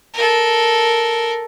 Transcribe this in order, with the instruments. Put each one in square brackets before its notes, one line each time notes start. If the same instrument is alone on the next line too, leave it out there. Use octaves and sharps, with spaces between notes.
[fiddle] A4 A#4